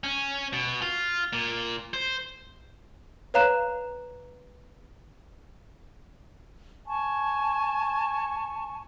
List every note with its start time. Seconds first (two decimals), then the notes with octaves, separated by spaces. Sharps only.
0.04 C#4
0.53 B2
0.82 F4
1.33 A#2
1.94 C5
3.34 B4 C#5 F5 A#5 F#6 E7
6.87 G#5 A5 C#6